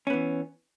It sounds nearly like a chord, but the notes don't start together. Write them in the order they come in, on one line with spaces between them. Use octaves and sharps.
C#4 B3 E3